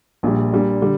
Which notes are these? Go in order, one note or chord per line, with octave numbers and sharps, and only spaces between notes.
A#1 A#2 G3
A#2 G3 D4
D3 G3